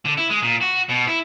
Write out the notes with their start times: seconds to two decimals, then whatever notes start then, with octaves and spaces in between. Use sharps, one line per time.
0.05 D3
0.18 E4
0.30 G#3
0.42 A#2
0.61 F#4
0.89 B2
1.08 E4